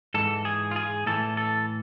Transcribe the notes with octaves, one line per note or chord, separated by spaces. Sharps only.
G#2 E3 A4
G#4
F4
G#4
A2 E3 A4
A4